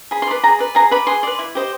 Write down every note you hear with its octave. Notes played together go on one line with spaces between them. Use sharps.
G#4 B5
C6
B4 D5 B5
G#4 A#5
B4 D5
G#4 A#5
B4 D5 B5
G#4 C6
B4 D5
E4
G4 C5 D#5